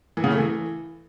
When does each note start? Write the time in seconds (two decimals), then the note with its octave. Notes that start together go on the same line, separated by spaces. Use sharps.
0.17 E3
0.24 C#3
0.31 A3
0.37 E3